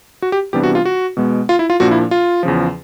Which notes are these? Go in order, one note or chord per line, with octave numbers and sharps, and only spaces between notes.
F#4
G4
C3 E3 G3 B3 D4 G4
F#4
F4
F#4
B2 G#3 B3
F4
E4
F4
A#2 F3 A#3 D4 F#4
E4
F4
E2 C#3 F3